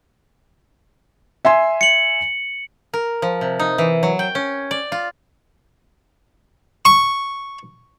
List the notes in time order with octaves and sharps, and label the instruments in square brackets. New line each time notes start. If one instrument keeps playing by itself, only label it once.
[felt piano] E5 G#5 C6
[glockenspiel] C#7 F#7
[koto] A#4
F3
C3
D#4
E3
F#3
G5
C#4
D5
F4
[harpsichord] C#6